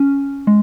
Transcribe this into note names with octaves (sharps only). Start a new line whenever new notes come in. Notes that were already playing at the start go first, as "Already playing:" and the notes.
Already playing: C#4
G#3